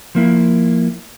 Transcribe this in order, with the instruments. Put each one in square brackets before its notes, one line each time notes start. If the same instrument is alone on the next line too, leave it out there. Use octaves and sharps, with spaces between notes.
[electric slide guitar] F3 A#3 E4